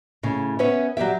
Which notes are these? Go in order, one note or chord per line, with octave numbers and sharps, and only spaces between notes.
A2 C#3
B3 C#4 B4 C#5 E5
F#3 G3 G4 E5